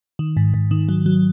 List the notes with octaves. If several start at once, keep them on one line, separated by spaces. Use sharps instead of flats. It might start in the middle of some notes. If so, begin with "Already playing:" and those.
D#3
G#2
G#2
D#3
F#3
F#3